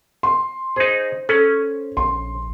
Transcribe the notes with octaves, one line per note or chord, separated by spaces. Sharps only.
C6
D#4 G#4 C5
C#4 A4
A#1 C6